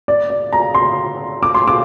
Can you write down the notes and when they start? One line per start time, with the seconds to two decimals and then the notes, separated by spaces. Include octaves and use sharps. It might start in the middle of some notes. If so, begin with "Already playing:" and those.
0.08 D5
0.30 D5
0.53 A#5
0.74 C6
1.43 D6
1.54 C6
1.68 D6